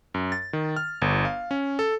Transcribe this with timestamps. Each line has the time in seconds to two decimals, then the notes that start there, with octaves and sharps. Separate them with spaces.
0.14 F#2
0.32 A6
0.53 D#3
0.76 F6
1.02 G1
1.25 F5
1.51 C#4
1.79 A4